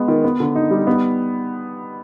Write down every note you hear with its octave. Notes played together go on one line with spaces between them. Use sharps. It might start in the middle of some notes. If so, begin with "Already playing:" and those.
Already playing: G#3 B3
D#3
B3
D3
D#4
G3
B3